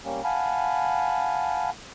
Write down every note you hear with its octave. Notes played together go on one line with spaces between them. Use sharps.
G3 A#3 C#4
F5 F#5 G#5 A5 B5